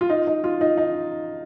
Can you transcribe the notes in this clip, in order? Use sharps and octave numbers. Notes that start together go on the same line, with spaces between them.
F4
D#4
D#4
F4
D#4
D#4